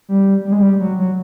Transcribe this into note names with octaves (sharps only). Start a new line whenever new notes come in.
G3
G3
G#3
G3
F#3
F#3